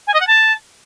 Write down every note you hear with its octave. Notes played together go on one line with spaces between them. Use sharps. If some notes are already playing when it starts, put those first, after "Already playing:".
G#5
D#5
F#5
A5